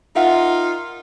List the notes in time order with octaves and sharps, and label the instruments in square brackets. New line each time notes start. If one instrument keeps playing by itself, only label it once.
[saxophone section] D#4 F4 [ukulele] A#4 E5 F#5